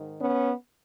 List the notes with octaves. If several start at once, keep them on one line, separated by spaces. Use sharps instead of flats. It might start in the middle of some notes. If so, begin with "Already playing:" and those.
Already playing: G#2 D#3
B3 C#4